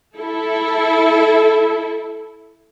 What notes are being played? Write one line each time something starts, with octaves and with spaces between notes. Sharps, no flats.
E4 A4